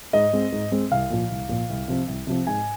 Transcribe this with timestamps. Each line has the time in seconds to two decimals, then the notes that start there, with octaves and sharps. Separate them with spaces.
0.13 G#2 D#5
0.33 G#3 C4
0.52 G#2
0.72 G#3 C4
0.91 C2 F5
1.10 A#2 F3
1.30 C2
1.49 A#2 F3
1.70 C2
1.88 C3 F3 C4
2.08 C2
2.27 C3 F3 C4
2.47 G#2 G#5